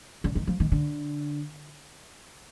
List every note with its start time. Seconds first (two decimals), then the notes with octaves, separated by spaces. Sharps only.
0.24 D3
0.35 D#3
0.47 F3
0.60 D#3
0.72 D3